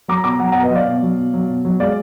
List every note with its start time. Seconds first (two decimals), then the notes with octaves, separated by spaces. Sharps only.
0.08 F#3 A#5 D6
0.24 B2 A#5 D6
0.39 F#3 F#5 A#5
0.52 B2 F#5 A#5
0.63 B4 D#5
0.71 F#3 D5 F5
0.87 B2
1.03 F#3
1.17 B2
1.34 F#3
1.49 B2
1.65 F#3
1.80 G#3 D5 F5